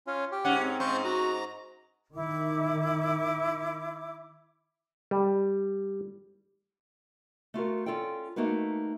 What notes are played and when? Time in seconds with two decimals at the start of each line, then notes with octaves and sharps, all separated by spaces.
0.07 C#4 F4
0.32 G4
0.45 G#2 C#4 F#5
0.62 C4
0.80 G#2 C5 F5 C#6
1.05 F#4 A#5
2.15 D#3 E4 D6
5.11 G3
7.54 A3 F4 F#4 A#4
7.86 C#4 E4 F4 A4 D5 G5
8.36 A3 A#3 D#4 F#4 B4